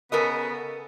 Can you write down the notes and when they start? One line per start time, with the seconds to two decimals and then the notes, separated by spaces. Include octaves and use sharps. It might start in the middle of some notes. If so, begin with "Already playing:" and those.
0.12 C#3 B3 A4 A#4 D#5